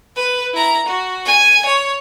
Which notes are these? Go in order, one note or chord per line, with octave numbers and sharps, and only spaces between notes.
B4
E4 A#5
F#4
G#5
C#5